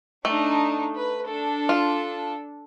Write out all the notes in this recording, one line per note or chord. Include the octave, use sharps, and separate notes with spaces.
A3 D4 D#4
B4
D4 A4
F4